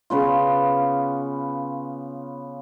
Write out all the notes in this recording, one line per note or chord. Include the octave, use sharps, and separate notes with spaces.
C#3 B3 F4